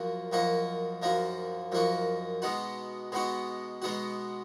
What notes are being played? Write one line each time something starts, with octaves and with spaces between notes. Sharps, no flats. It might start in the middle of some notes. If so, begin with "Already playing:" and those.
Already playing: F#2 F3 A#3 F#4
F#2 F3 A#3 D#4 F#4
F#2 F3 A#3 D#4 F#4
F#2 F3 A#3 D#4 F#4
B2 G#3 B3 D#4 F#4
B2 G#3 B3 D#4 F#4
B2 G#3 B3 D#4 F#4